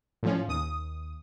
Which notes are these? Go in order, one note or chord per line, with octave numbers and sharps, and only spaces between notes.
A2 F3 C#4
D#2 D#6